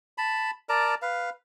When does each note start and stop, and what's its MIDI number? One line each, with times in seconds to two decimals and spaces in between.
0.18 0.51 81
0.18 0.51 83
0.69 0.95 70
0.69 0.95 74
0.69 0.95 81
0.69 0.95 82
1.02 1.30 71
1.02 1.30 77